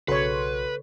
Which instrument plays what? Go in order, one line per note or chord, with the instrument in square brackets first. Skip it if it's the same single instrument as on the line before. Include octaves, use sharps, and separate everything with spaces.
[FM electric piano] B1 F#4 C6 [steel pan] C#3 C#5 [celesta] A4 [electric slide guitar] B4